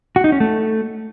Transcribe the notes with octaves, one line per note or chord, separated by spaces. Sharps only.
F#4
D#4
C#4
A3